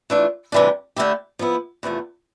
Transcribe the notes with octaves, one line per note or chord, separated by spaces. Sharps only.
E3 A3 D4 F4
D2 C3 E3 G3 D4
D3 A3 E4 G4
F3 B3 E4
E2 C3 F3 A3